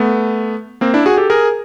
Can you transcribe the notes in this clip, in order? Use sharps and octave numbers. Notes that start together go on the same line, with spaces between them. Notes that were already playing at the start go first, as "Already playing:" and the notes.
Already playing: A3 B3
A#3 C4
D4 E4
F#4 G#4
G4 A4
G#4 A#4